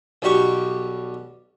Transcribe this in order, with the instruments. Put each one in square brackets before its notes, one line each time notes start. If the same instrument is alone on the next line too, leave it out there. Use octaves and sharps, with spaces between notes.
[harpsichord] B1 G3 F#4 G4 C#6